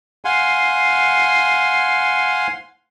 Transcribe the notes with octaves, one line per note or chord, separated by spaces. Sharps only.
F5 F#5 G#5 C6